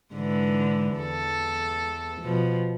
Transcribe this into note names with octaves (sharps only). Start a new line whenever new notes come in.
G#2 D3 E3
E2 A4
B2 F3